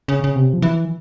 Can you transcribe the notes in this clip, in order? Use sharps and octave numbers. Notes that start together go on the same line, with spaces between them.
C#3
C#3
C3
F3
E3